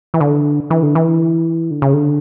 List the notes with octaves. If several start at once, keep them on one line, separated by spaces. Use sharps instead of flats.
E3
D3
E3
D3
E3
D3
C#3
D3